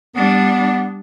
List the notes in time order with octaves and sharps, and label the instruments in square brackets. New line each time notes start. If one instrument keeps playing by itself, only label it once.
[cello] G3 D4 [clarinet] B3